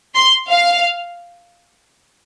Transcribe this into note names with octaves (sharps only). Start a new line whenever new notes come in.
C6
F5